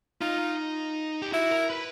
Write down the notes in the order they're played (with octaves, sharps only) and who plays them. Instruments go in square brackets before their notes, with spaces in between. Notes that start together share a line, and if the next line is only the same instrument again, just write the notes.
[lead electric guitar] D#4 [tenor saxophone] F4
[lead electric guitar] G4
[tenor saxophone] E4 [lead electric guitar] F#4
[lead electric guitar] A#4
B4